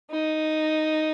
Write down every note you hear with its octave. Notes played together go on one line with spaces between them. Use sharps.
D#4